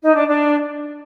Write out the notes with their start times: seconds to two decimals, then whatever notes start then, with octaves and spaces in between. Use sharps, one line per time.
0.03 D#4
0.14 D4
0.25 D4